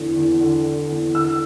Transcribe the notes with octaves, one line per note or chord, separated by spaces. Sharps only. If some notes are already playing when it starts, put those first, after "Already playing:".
Already playing: E2 D3
E2
D3
D3
E2
D3 E6